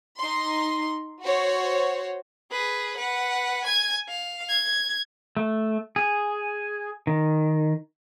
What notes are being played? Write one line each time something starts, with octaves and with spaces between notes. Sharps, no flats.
D#4 C6
F#4 C5 C#5
G#4 B4
B4 F#5
G#5 G#6
F5
G#6
A3
G#4
D#3